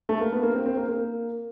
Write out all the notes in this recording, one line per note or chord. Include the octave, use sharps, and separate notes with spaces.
A3
A#3
B3
A#3
C4
C4
A#3
A#3